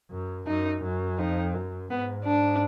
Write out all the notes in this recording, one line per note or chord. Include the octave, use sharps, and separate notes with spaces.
F#2
F#2 D#4
F#2
F2 D#4
F#2
G#2 B3
D4